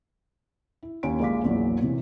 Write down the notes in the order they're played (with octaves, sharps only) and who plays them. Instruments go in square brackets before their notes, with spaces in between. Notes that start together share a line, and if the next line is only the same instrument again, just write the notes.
[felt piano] E4
D#2 D#3 C#4 G#5 D7
A#1 G#3 F4 F5 D6 B6
A#1 E2 A#2 E3 F#3
A2 C3 E3